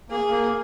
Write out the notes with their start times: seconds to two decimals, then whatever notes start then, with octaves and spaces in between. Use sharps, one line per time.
0.10 A#3 G#4
0.30 A#3